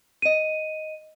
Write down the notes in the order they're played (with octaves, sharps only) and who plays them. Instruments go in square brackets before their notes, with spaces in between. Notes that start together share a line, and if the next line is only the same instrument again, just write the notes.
[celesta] D#5 D#7